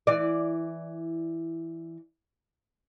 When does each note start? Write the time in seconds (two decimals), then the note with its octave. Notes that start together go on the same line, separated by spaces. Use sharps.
0.07 E3 D5